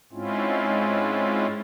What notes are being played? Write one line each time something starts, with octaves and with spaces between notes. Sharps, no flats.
G#2 G#3 C4 C#4 E4 F4